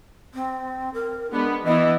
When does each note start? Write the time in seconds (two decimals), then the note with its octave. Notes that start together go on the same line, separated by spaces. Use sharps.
0.34 C4
0.94 A#4
1.31 G#3 B3 D4
1.64 E3 B3 E4 D#5